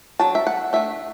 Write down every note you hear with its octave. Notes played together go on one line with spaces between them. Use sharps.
F#3 D4 A5
E5
F#5
A3 D4 E5